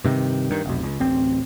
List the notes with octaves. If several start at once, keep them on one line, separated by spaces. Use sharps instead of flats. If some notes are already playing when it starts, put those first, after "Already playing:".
G2 C3 D#3
G2 D#3
F1 B1
C#2
D1 A1 C4